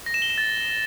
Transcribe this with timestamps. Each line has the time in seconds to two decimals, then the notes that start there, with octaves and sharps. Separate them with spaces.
0.06 A#6
0.14 E7
0.22 G7
0.30 E7
0.38 A6